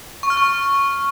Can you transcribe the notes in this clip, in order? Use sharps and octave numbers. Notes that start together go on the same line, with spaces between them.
C#6
F6
C#6